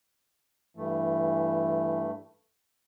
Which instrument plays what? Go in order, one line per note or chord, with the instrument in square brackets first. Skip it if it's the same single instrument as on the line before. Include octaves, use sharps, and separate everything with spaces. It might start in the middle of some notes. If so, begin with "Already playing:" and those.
[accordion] G2 A3 [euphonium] E3